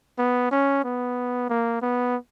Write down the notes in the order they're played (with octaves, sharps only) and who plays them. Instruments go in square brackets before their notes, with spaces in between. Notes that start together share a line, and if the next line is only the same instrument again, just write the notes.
[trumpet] B3
C#4
B3
A#3
B3